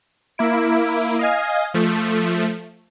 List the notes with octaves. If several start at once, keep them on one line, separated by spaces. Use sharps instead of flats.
A#3 E4 D7
D#5 F5 G#5
F3 A3